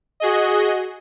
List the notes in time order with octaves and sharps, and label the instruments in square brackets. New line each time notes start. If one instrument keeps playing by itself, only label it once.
[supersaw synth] F#4 G#4 D#5